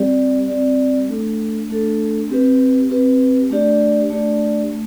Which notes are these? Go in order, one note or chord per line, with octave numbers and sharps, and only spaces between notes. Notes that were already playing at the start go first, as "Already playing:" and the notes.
Already playing: G3 C4 G4 D5
G3 C4 G4 D5
A3 D4 A4
A3 D4 A4
C4 G4 B4
C4 G4 B4
A3 D4 G4 D5
A3 D4 G4 D5
A3